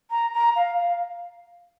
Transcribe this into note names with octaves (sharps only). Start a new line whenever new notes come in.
A#5
A#5
F5
F5